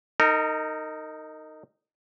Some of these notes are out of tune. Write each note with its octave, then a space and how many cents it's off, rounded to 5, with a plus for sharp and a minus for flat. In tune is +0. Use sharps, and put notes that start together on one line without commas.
D#4 +0 A#4 -35